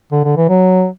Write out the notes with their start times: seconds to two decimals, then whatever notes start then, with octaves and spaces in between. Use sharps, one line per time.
0.12 D3
0.24 D3
0.37 E3
0.49 F#3